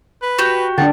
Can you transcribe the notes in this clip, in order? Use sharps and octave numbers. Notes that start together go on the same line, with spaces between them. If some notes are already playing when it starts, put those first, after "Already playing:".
B4
F#4 G4
D3 D4 F#5 G5 A6